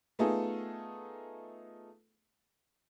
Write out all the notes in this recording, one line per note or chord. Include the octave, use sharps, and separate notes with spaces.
A3 B3 D#4 F4 G#4 A4